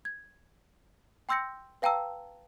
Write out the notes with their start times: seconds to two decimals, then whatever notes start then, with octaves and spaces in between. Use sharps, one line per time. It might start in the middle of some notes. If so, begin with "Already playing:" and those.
0.05 G#6
1.29 G5 C6 E6 G6 A#6 C#7
1.82 B4 F5 G5 A5 A#5 E6